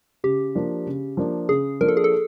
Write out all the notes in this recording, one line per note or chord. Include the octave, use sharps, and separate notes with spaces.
C#3 G4
F3 A#3 D4
C#3
F3 A#3 D4
C#3 G#4
F3 A#3 D4 A#4
A4
G#4
A4